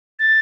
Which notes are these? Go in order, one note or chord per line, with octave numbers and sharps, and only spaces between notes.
A6